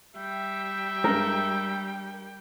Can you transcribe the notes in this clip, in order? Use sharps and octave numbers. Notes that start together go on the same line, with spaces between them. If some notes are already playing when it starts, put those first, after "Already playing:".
G3 E5 G5
G2 G#3 A#4